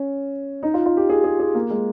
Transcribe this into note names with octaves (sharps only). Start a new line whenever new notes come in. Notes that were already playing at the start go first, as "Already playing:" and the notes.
Already playing: C#4
D#4
F4
F4
G4
G#4
G#4
G#4
A#3
G#3